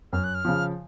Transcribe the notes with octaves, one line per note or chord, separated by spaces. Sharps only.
F#2 F6
F#6
F6
C#3 F3